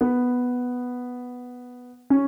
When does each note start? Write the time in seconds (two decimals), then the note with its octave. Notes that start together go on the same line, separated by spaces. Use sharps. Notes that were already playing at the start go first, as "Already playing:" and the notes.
0.01 B3
2.10 C#4